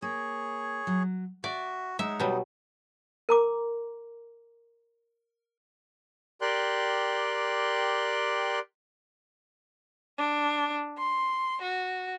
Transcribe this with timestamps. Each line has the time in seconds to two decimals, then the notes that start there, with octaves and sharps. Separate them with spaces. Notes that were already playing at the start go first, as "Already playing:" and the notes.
0.02 A#3 G#4 C#5
0.87 F#3
1.44 F#4 D5 E5
1.99 G#3 D#4 C#5 E5 F#5
2.20 B2 F#3 G3
3.29 A#4 A#5 D6
6.41 G4 A#4 D5 G5 C6 F#6
10.18 D4
10.98 C6
11.62 F#4